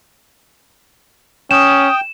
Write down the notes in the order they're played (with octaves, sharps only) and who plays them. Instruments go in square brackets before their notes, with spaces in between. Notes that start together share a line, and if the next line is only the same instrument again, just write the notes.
[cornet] C#4 [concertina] G5 [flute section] D#6 [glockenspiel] E7